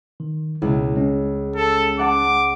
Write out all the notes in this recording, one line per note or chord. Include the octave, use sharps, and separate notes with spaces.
D#3
C#2 B2 G#3 E4
G#3 C#4
A4
F#5 A5 D6